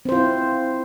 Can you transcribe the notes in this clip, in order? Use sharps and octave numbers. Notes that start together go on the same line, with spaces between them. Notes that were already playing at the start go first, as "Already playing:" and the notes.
C4 E4 F4 C5